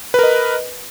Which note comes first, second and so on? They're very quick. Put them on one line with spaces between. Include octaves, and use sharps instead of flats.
B4 A#4 D#5